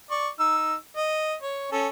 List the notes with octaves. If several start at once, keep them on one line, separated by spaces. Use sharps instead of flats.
D5 C#6
D#4 E6
D#5
C#5
C#4 A4